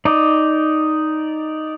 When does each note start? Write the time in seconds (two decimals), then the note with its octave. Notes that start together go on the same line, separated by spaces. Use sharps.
0.05 D#4 D5